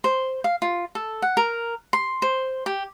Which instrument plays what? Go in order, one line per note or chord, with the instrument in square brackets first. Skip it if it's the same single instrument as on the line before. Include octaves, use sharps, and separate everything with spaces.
[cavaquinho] C5
F5
F4
A4
F#5
A#4
C6
C5
G4